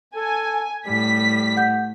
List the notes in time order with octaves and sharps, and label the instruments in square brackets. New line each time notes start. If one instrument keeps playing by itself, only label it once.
[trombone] A4 [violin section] G#5
[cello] A2 [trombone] G3 [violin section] B6
[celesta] F#5 G6